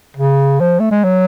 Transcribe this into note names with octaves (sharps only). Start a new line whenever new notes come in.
C#3
F3
A3
G#3
F#3